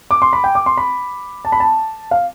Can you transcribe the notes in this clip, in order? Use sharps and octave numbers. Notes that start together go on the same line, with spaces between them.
D6
C6
B5
G5
D6
C6
B5
A5
B5
A5
F5